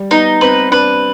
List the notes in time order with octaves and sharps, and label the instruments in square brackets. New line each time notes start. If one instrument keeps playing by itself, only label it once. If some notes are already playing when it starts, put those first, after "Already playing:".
Already playing: [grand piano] G3
[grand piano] B3 [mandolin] D#4
[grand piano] C4 [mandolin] B4
[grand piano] D4 [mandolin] B4